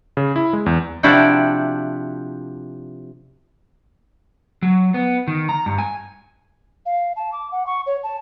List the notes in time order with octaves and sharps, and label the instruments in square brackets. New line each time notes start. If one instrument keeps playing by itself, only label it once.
[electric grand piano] C#3
E4
G#3
E2
[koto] C3 F3 D4 E4 F#4 G5
[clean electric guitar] F#3
B3
D#3
A#5
G2
G#5
[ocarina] F5
A5
D6
F#5
C#6
C#5
A5